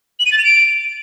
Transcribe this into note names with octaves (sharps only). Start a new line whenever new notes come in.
F#7
D#7
A6
F7
D7